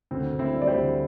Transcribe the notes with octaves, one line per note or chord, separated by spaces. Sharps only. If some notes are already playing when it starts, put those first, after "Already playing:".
D2 C4
D2
C4 E4
G3
D5
G4 C5
D2